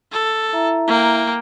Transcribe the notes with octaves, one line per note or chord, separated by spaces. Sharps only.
A4
E4 E5 A#5
A#3 G5